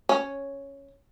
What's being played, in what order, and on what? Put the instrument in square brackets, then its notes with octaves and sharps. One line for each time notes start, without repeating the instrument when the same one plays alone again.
[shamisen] C#4